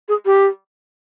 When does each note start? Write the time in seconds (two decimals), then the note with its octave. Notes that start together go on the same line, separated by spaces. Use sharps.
0.08 G#4
0.25 G4